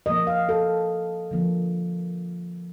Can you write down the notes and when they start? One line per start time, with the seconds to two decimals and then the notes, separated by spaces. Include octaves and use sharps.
0.06 A#2 F3 A#3 D#5
0.27 F5
0.49 A4
1.31 D3 F3 A#3